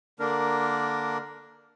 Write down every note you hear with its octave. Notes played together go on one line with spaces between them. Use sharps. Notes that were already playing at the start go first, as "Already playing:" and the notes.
D3 A#3 D4 A#4